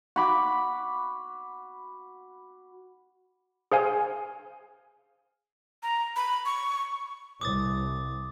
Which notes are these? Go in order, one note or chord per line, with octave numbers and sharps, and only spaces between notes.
F#4 B5 D6
G#4 C5 F5 G#5
A#5
B5
C#6
C2 D6 D#6 A6